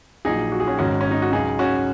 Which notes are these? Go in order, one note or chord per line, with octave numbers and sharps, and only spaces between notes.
A#1 A#2 F#3 D#4 G#4
F#4
G#4
C#4 F#4
G#1 G#2 D#3 C#4 F#4
C#4
D#4
F#4
C#2 C#3 F#3 D#4 G#4
C#4 F#4